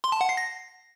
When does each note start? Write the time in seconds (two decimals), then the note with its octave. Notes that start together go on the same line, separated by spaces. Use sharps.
0.04 C6
0.12 A5
0.21 F#5
0.29 C7
0.37 A#6